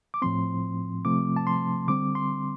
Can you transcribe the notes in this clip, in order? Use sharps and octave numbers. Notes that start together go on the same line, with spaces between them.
D6
A2 F3 C4 C6
C3 F3 A3 C4 D6
A5
C6
D3 G3 C4 D6
C6